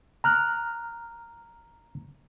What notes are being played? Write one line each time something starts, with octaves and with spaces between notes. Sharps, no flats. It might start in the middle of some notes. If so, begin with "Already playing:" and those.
A#5 F6 F#6